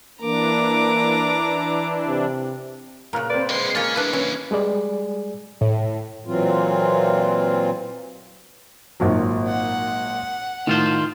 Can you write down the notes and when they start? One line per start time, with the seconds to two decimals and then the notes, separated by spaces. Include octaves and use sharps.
0.22 E3 A#3 D4 A#5 D6
2.08 C3
3.13 A#2 C#3 A#5 F6 F#6
3.30 C4 B4 D5
3.50 D3 G#3 C6
3.75 A#3 C#4 F4 A6
3.96 A#3 D4 E4 B4
4.13 E3 C#4
4.51 G3 G#3 G#4 D5
5.61 A2
6.26 A#2 E3 F#3 C4 F4
9.00 G#1 A#2 F#3
9.48 F#5
10.67 A2 D#3 F4 C5